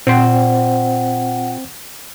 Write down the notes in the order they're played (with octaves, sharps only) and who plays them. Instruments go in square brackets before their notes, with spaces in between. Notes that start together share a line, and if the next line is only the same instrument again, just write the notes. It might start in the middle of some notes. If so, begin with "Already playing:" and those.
[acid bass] A#2 [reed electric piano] C4 C5 [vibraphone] F#5 G5